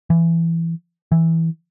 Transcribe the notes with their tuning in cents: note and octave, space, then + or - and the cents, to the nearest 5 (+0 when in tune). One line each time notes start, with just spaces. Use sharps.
E3 +15
E3 -10